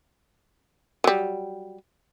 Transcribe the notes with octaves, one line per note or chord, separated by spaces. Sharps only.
F#3 G3